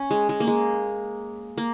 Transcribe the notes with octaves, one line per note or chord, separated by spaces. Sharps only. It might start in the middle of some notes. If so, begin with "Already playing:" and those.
Already playing: C#4
G#3
G#3
A#3
G#3
A#3